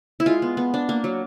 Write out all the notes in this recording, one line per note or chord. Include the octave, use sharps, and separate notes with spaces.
E4
G#3 F4
B3
B3
D4
A#3
F#3